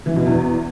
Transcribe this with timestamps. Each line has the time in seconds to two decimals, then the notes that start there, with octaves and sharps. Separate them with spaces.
0.06 E3
0.16 B2
0.26 E2